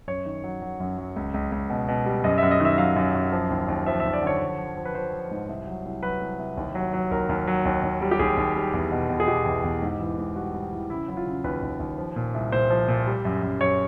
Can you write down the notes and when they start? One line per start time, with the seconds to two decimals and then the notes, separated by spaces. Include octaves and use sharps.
0.07 F#2 C#5
0.25 D#3
0.44 F#3
0.62 F#3
0.80 F#2
0.98 F#3
1.16 C#2
1.34 C#2
1.52 C#2
1.70 B2
1.88 B2
2.06 G3
2.24 F#2 D#5
2.38 F#2 E5
2.51 D#5
2.60 D#3 E5
2.78 F#3 F5
2.96 F#2
3.15 F#2
3.32 F3
3.50 D#2
3.68 D#2
3.86 F3 E5
4.00 D#2 E5
4.13 D5
4.22 D3 C#5
4.41 F3
4.59 F3
4.77 F3
4.85 B4
4.95 F3 C5
5.13 F3
5.31 G#2
5.48 C2
5.67 F#3
5.85 C2
6.03 F#3 B4
6.21 C2
6.39 C2
6.57 D#2
6.75 F#3
6.93 F#3
7.11 D#2 A#4
7.29 D#2
7.47 F#3
7.65 D#2
7.83 D#2
8.01 G3
8.11 G4
8.19 D#2 G#4
8.37 D#2
8.56 G3
8.74 E2
8.92 B2
9.10 B2
9.20 G#4
9.28 B2 G4
9.46 E2
9.64 E2
9.82 G#2
10.00 E3
10.18 G#2
10.36 G3 F#4
10.54 G3
10.72 E3
10.90 C#3 E4
11.08 F#3 E4
11.17 F4
11.26 C#3
11.44 D#2 B4
11.62 D#2
11.80 D#2
11.98 F3
12.16 A#2
12.34 C2
12.52 A#2 C5
12.70 F3
12.88 A#2
13.07 G3
13.25 F#2
13.43 F#2
13.60 F#2 C#5